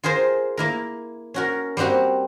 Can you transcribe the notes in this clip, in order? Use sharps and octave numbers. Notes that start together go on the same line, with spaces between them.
F4 G#4 A#4 C5
A#3 E4 A#4
C#4 F#4 A#4
G3 A#3 C4 F#4 G4